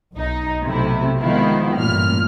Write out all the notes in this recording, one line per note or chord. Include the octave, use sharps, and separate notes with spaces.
B1 D#4
B1 C3 A3 E4
D#3 F3 G#3 B3 E4 F4
A1 G2 A#2 F6